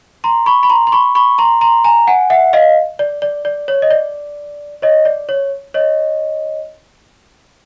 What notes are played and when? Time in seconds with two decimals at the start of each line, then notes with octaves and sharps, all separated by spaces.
0.24 A#5 C6
0.46 B5 C#6
0.63 B5
0.70 A#5 C6
0.87 C6
0.92 B5 C#6
1.15 B5 C#6
1.38 A#5 C6
1.61 A#5 C6
1.84 G#5 A#5
2.07 F#5 G#5
2.30 E5 F#5
2.53 D#5 F5
2.99 D5
3.22 D5
3.45 D5
3.68 C#5
3.82 D#5
3.91 D5
4.82 C#5 D#5
5.05 D5
5.29 C#5
5.74 C#5 D#5